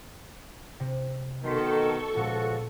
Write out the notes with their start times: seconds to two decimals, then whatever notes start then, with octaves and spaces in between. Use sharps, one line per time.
0.80 C3
1.44 B2 D#3 A3 A4 C6 C#6 B6
2.16 C#2 A#2 F3 F#4